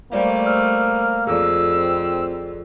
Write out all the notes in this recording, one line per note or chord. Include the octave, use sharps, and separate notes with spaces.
G3 A3 A#3 C5 D5 F5
C5 E6 F6
F2 G#4 A4 D5 E6
C4